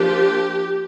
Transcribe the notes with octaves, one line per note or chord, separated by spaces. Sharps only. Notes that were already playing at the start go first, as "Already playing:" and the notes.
Already playing: F3 A#3 D4 G4